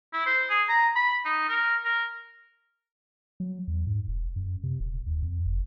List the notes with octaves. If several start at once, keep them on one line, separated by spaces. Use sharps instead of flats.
E4
C5
G#4
A#5
B5
D#4
A#4
A#4
F#3
E2
G#2
E1
F#2
C3
D#1
D#2
F2
F#1